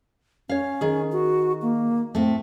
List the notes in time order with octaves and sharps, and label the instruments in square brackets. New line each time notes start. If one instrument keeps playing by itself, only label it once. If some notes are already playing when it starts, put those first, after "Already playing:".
[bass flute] C#4 [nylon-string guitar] C#5 F5
[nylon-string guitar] D#3 G#4
[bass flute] F#4
A#3
[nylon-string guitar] A2 A3 [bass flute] C4